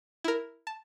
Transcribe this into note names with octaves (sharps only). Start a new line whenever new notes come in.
E4 A#4
A5